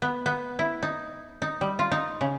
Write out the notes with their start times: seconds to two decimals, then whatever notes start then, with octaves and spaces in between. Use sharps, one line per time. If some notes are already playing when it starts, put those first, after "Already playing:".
0.02 B3
0.26 B3
0.59 E4
0.83 D#4
1.42 D#4
1.61 G3
1.79 F4
1.91 D#4
2.21 C#3